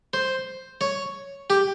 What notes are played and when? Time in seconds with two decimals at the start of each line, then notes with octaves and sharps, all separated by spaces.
0.13 C5
0.81 C#5
1.50 G4